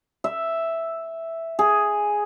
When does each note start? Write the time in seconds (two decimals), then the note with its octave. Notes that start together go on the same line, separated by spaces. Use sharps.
0.24 E5
1.59 G#4